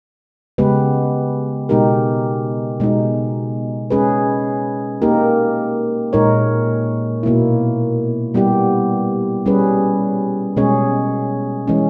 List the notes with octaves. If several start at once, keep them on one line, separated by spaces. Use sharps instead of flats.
C#3 G#3 B3 G4 B4
B2 G#3 D#4 G4 A#4
B2 G#3 D#4
G#3 C#4 G#4 B4
A#3 D#4 G4 A#4
A#2 G#3 D#4 A#4 C#5
B2 A#3 E4
G3 B3 E4 G4
G3 C#4 G#4 B4
B2 G#3 C#4 G#4 C#5
E3 G#3 C#4